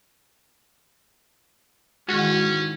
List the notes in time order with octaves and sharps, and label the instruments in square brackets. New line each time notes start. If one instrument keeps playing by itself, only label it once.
[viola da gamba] G#2 D#3 E3 [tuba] G#3 [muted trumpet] C#4 [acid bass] F#4